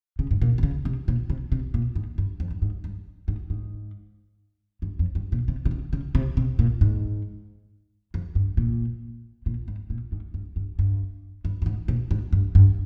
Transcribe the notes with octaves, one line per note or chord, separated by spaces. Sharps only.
C#3
G#2
A#2
C3
C#3
C3
A#2
C3
C3
A#2
G#2
G2
F2
G2
G#2
G2
G#2
G#2
G2
F2
G2
A#2
C3
C3
C#3
C#3
C3
C3
A#2
G#2
F2
G2
A#2
A#2
G#2
A#2
G#2
G2
G2
G2
G2
G2
G#2
A#2
G#2
G2
G2